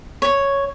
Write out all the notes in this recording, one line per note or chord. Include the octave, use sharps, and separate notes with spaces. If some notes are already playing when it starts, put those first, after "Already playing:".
C#5